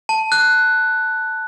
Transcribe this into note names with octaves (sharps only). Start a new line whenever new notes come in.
A5
F#6